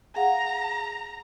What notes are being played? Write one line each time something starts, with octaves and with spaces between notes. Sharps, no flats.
G#4 F5 F#5 A#5